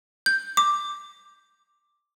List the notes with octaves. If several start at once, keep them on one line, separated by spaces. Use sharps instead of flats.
G6
D6